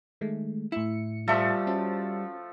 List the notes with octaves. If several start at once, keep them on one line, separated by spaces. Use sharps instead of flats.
D#3 G#3 A3
A2 E4 C#7
F3 G3 A3 A4 E5
C#4 F#4 C5